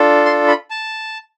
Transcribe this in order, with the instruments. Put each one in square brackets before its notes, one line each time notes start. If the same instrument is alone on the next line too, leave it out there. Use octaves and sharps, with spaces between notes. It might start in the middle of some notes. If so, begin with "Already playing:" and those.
Already playing: [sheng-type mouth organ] D4 F4 A4
C6
B5
A5